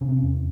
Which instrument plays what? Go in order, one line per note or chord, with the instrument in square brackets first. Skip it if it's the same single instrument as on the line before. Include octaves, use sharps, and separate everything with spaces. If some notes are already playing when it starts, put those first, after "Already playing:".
[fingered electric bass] C3 C#4
C4
C#4
E2